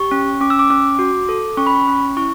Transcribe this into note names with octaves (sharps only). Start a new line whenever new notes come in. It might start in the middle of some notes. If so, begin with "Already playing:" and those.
Already playing: G4 C#6
C#4
C#4 D6
E6
D6
C#4 D6
F#4
A4
C#4 C#6
B5
C#6
C#4
E4 C#6